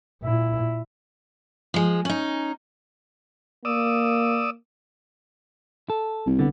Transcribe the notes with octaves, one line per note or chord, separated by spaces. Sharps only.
A#2 E4
F3 G#3
C#4 D#4
A#3 D5 D#6 E6
A4
C2
D3 B3